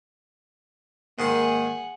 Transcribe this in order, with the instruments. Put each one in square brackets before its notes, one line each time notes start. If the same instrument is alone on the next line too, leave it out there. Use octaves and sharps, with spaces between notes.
[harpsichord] G#2 D#3 C6 [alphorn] A#3 [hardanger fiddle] G#4 F#5